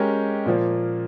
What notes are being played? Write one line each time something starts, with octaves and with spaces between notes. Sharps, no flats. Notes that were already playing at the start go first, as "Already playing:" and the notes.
Already playing: G#3 C#4 G4 A#4
A#2 F3 A#3